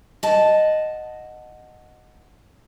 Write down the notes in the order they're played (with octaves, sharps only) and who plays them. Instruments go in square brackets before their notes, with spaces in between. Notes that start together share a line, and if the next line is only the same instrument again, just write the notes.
[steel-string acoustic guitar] D#5 F#5 A5